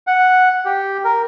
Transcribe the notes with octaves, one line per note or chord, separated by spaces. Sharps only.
F#5
G4
A#4